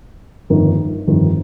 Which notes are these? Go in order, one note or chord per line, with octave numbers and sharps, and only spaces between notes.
G1 F2 D#3 A#3 D#4
G1 F2 D#3 G3 C4